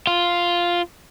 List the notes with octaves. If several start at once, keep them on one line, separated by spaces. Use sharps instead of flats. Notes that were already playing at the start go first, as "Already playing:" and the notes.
F4